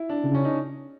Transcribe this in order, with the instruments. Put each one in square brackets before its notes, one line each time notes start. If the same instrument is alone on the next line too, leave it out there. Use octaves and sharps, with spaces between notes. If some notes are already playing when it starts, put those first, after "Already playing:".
Already playing: [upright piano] E4
D4
[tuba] C#3
[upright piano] C#4
D#4